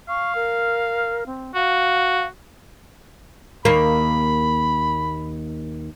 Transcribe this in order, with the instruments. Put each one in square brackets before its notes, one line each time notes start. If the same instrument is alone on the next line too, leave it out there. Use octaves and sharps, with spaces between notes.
[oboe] F5 [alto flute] C#6
[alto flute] A#4
C4
[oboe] F#4 [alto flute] F5
[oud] D#2 A#3 [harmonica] B5